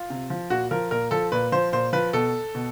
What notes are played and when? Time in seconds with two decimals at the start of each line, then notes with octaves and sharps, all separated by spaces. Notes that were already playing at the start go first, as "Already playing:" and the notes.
Already playing: F4
0.10 C3
0.30 F3
0.50 A#2 F#4
0.71 F3 A#4
0.91 A#2 A#4
1.11 F3 A4
1.32 A#2 B4
1.52 F3 C5
1.72 A#2 C5
1.93 F3 B4
2.13 B2 A4
2.55 B2